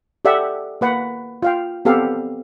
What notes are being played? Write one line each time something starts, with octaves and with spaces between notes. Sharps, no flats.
G4 A4 D5 E5 F#5
A#3 B4 F#5
F4 F5 G5
B3 C4 G4 A4 F5